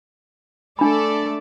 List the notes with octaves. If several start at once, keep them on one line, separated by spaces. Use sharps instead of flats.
A3 D4 A4 D5 B5